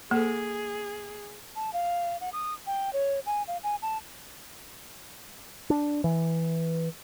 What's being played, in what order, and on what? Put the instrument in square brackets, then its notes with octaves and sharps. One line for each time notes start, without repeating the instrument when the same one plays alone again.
[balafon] A#3 A4 [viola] G#4
[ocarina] A5
F5
F#5
D#6
G5
C#5
G#5
F5
G#5
A5
[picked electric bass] D4
E3